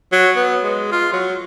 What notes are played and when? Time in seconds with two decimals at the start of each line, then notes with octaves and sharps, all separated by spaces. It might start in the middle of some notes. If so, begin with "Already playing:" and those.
0.13 F#3
0.37 B3
0.63 G#3
0.92 F4
1.13 F#3